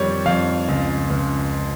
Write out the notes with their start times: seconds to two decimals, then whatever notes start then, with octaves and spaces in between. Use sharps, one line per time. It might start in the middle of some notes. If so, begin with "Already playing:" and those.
Already playing: F2 D#3 G3 C#5
0.26 F2 F5
0.68 C#2
1.10 C#2